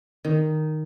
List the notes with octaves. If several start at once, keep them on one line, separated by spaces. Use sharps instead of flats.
D#3